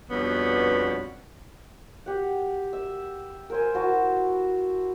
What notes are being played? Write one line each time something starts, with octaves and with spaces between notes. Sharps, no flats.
F2 B2 G3 B3 C#4 D4
G4 F#5
E5
A#4 C5 G#5
E4 F#4 A5